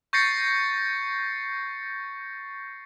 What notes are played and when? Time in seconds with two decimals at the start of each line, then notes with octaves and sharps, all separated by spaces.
0.13 C#6 G6 A6 A#6 C7 C#7